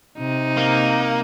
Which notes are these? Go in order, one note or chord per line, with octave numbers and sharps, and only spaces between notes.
C3 D#4
A#3